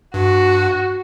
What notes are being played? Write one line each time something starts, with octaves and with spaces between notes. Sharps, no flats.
G2 F#4